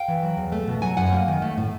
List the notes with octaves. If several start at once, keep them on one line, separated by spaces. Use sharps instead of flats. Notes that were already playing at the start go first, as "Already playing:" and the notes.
Already playing: F5 G5
E3
F#3
E2
A3
B2
F#3 F#5 G#5
F#2 F#5 G#5
A#3
D#3
A3
A2